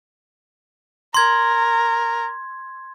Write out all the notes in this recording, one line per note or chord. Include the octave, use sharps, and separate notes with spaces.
A#4 C6 G#6